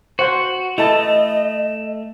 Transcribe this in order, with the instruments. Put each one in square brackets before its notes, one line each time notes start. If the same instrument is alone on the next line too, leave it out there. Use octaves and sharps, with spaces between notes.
[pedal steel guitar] F#4 [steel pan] C5 F#5 C6
[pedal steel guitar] A3 [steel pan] E4 A4 A5 [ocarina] D#5